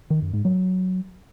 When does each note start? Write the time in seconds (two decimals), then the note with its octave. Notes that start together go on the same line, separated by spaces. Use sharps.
0.10 D#3
0.22 F#2
0.33 G#2
0.45 F#3